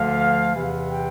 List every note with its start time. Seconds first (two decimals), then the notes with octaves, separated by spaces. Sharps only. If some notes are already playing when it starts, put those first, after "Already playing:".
Already playing: D2 D3 F3 F5
0.55 E2 C3 E3
0.90 G5